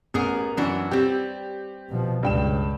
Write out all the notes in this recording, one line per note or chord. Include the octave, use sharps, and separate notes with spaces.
A1 B3 G#4 A#4
F#2 E3 D4 F#4
G3 C4 G4
B2 F3
C#2 G2 C#3 G5 E7